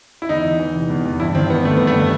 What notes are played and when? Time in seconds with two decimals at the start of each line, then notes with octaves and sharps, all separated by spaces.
0.22 E4
0.29 E2 D#4
0.44 E2
0.60 E3
0.74 C3
0.90 E2
1.05 E2
1.20 G2 E4
1.34 D#3 C4
1.50 G2 B3
1.65 D#3 A3
1.77 B3
1.80 G2
1.87 A3
1.95 D#3 B3